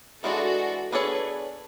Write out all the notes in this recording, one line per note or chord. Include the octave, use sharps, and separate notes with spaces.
E3 G#3 D4 F#4 A4
B3 D4 G#4 A4 B4 C#5